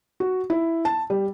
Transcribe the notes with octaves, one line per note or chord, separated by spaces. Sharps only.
F#4
E4
A5
G3